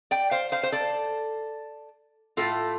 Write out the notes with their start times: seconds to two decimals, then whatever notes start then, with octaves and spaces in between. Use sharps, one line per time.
0.11 D5 G5
0.31 C5 F5
0.52 C5 F5
0.63 C5
0.72 A4 D5
2.37 A2 A3 F4 A4